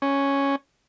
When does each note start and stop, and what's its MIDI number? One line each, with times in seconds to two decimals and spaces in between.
0.02 0.56 61